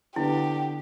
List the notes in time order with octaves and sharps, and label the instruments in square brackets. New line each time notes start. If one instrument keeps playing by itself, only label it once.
[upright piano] D3 B3 [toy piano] E4 [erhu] G4